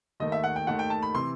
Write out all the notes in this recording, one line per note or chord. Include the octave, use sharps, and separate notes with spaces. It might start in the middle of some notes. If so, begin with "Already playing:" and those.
D#2 D#3 A3 D#5
E5
F#5
G5
D#2 D#3 A3 F#5
G5
A5
B5
C3 E3 C6